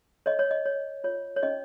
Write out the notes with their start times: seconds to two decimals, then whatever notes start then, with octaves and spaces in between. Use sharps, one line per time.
0.26 C#5 D#5
0.39 C#5
0.51 D#5
0.66 C#5
1.04 F4 C#5
1.36 C#5
1.43 C#4 D#5